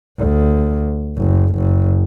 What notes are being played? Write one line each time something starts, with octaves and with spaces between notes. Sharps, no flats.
D2
F#1
F#1